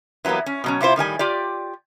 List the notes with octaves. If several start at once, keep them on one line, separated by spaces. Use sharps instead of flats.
E3 F#3 G3 A#3 B3
C#4
B2 F#3 C#4
C3 E4 F4 C5
A2 D#3 G3 G#5
F4 G4 D5